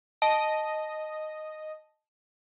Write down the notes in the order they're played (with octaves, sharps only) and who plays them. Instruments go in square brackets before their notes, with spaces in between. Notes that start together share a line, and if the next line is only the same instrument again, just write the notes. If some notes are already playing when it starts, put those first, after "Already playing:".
[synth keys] D#5 [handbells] A5